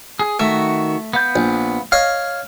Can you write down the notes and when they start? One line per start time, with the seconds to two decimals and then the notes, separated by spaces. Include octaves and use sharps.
0.19 G#4
0.40 D#3 A3 F#4 E5
1.13 B3 F5 G6
1.36 A#1
1.92 C#5 D#5 F5 F6